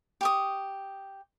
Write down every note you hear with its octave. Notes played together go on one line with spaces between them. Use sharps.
G4 C#6 D#6